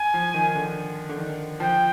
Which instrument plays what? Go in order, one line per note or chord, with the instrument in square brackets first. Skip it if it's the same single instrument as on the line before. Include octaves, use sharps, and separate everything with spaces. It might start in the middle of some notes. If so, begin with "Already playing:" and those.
Already playing: [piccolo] G#5
[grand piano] F3
D#3
D3
D3
D#3
[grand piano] F3 [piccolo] G5